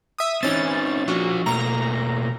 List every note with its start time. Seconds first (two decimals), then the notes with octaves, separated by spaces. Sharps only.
0.18 E5 D#6
0.43 E3 C4 C#4 D#4 A6
1.08 F3 D4 F4 F#4
1.46 B2 A3 A#3 A#5